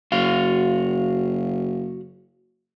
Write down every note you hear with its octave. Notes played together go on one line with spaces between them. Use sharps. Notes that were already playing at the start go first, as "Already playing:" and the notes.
F#1 F#4 F5